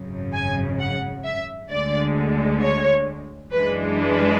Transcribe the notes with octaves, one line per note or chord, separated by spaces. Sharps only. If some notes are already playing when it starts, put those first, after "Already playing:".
Already playing: G#1 F#2 C#3
G#5
F#5
E5
D2 D3 G#3 D5
C#5
F#2 E3 G#3 D4 B4
B4